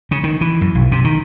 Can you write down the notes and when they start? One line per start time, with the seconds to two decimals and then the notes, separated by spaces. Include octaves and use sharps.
0.11 C#3
0.24 D#3
0.41 E3
0.61 F#2
0.75 B1
0.92 C3
1.04 D#3